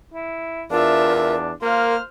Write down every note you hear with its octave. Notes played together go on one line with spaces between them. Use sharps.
E4
E2 D4 F4 A#4 E5
D4
A#3 F4 A#4 C5 F6